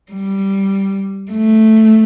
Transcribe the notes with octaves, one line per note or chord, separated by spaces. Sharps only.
G3
A3